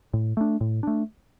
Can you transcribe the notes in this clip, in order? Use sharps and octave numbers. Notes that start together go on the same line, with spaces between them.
A2
A3 D4
A2
A3 D4